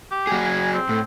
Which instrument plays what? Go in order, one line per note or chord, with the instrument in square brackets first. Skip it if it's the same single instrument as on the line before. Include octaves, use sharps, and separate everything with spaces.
[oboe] G4
[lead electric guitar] F#3 G#4
[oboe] G#5
C4
[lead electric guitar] A2